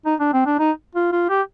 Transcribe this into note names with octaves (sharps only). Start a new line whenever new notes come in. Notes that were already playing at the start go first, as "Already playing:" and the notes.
D#4
D4
C4
D4
D#4
F4
F4
G4